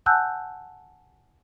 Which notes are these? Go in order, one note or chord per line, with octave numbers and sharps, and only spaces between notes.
F#5 G#5 A5 E6 F#6 G6